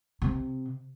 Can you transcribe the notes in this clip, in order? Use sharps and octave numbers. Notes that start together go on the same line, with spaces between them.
C3